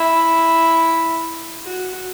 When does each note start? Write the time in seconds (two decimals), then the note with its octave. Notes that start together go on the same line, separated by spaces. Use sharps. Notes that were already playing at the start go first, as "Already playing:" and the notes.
Already playing: E4
1.64 F#4